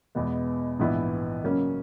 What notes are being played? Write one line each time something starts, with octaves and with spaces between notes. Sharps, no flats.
E2 B2 G#3 B3
A#1 G#2 E3 B3 E4
C#3 F#3 A#3 C#4